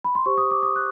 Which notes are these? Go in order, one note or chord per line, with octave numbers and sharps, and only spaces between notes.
B5
C6
G4 C5 C#6
D#6
D6
D#6
F#6